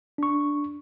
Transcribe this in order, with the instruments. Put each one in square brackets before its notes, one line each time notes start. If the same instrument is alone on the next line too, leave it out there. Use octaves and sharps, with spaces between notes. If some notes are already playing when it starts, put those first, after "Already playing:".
[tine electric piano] D4 C#6